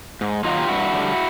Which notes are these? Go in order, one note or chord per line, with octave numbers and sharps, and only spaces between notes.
G#2
D#3 F#3 A#3 D#4 F4
G4
G2 E4 F#4
D3 G3